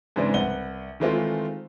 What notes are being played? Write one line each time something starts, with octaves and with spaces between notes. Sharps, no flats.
G#2 C#3 E3 G#3 C4 D4
C2 B4 F#5 G7
D#3 E3 G#3 A3 C4 F4